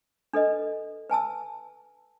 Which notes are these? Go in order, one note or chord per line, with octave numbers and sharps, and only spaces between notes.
D4 A4 B4 D#5
B4 G#5 A5 E6